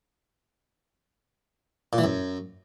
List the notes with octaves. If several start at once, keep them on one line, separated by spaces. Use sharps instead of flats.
A#2
E3
F#2